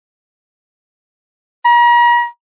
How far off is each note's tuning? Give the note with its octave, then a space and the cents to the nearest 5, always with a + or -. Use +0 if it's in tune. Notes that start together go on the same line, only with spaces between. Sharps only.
A#5 +40